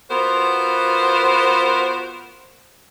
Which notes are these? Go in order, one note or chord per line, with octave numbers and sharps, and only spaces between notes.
B3 F4 F#4 A#4 C5